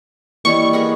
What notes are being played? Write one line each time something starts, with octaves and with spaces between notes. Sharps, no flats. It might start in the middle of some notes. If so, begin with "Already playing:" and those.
E3 G3 A#3 C#5 D#5 C#6
B3 G#4 A#4